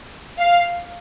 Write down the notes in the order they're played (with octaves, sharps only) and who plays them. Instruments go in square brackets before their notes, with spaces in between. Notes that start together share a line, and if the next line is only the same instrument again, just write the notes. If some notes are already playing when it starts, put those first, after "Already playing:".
[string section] F5